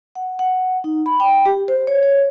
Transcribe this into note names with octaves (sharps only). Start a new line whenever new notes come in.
F#5
F#5
D#4
B5
G5
G4
C5
C#5
C#5